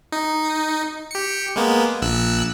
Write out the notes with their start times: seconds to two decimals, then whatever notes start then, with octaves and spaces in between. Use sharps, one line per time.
0.12 D#4
1.11 G4 C#7
1.56 G#3 A#3 B3
2.02 A#1 E6 F#6